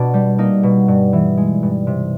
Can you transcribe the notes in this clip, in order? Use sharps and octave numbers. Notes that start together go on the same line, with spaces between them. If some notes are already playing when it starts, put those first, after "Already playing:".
Already playing: B2 D4
G3
A#3 D#4
B2
G2
E3
G#3
G2
C3